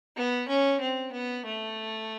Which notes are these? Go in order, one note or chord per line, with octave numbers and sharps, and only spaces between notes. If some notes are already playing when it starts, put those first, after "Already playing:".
B3
C#4
C4
B3
A3